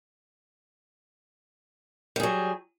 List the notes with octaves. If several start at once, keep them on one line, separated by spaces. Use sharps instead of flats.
F#3 G3 G#4